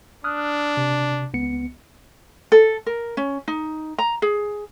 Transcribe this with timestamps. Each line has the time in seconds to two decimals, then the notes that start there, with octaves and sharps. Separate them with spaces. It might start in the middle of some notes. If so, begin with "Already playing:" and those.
0.24 D4 D#6 F6 F#6
0.77 C3
1.34 C#2 B3 C#7
2.52 A4
2.86 A#4
3.17 C#4
3.48 D#4
3.98 A#5
4.22 G#4